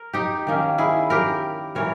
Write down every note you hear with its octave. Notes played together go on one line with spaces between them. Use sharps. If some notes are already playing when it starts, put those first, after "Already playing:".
Already playing: A#4
D#4 G4
D#3 A#3 C#4
E4 G#4
G4 A#4
E3 G3 A#4 C#5